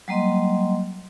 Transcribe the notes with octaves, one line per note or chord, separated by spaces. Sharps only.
F#3 G3 A#3 D#5 C6